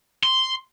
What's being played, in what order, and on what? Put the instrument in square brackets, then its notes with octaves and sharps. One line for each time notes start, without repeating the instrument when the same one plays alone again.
[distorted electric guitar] C6